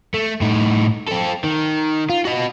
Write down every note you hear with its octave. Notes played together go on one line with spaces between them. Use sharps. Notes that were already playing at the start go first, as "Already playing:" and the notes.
A3
A2 D#4
C4 A4
D#3
F4
F#4 D#5